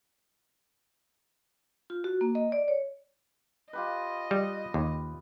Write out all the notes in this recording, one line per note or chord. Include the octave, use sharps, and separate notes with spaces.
F4
F#4
A#3
D#5
D5
C#5
F4 G4 B4 D#5
G3
D#2